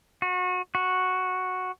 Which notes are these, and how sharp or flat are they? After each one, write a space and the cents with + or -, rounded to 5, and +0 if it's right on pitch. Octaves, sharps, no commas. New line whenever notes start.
F#4 -30
F#4 -5